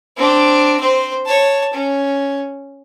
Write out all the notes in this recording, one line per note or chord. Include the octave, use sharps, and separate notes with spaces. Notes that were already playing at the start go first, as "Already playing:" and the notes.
C4 D4
C4 C5
C#5 A5
C#4